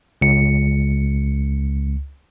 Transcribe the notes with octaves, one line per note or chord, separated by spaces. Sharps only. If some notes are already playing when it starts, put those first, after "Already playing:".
C#2 C#7